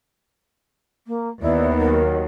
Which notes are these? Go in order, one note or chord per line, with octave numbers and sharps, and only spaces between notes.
A#3
D#2 B3 D#4 E4 D5
D#3 F#3 A#4